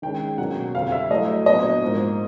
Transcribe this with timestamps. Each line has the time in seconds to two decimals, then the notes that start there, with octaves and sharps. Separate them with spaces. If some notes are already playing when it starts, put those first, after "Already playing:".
0.02 D#3 G#3 C#4 G5
0.38 B2 F#3 A#3 C#4 F#5
0.74 F2 D3 G3 C4 F5
0.92 E5
1.10 A2 F#3 A3 D#5
1.46 A#2 F#3 B3 D4 D#5
1.82 G#2 F3 A#3